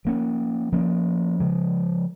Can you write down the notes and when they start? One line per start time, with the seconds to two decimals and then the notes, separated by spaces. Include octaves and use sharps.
0.05 F3 A#3 C#4
0.72 F3 A#3 C#4
1.40 C#3 F3 G#3